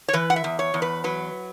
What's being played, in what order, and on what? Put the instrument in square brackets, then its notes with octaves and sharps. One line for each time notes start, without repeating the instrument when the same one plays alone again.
[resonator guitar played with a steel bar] C#5
E3 B4
F#5
E5
E2
C#5
E2
B4
F#3 B4